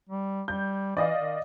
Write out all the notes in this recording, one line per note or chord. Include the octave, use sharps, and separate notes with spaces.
G3
G3 G6
E3 D5 D#5 F5
D#3